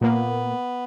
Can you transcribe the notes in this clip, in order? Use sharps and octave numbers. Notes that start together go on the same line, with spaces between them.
A#2 A#3 B3